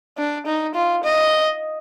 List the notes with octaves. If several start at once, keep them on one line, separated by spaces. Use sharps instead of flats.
D4
D#4
F4
D#5